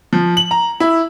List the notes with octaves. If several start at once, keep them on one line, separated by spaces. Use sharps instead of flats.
F3
F#7
A#5
E4